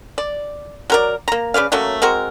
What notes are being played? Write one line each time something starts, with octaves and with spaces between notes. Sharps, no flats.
D5
F#3 A#4 D5
A#3 A#5
C#3 B4 D5 F5
F#3 A3 A#3 C#4
G#3 C4 F#4 A#4